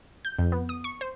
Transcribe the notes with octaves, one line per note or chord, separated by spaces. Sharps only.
G6
F2
B3
D#6
C#6
C5